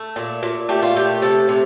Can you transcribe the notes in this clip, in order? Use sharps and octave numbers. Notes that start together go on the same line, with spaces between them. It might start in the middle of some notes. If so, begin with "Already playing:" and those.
Already playing: A3
A#2
A#2
A3 G4
F4
A3 G4
C3 A4
C3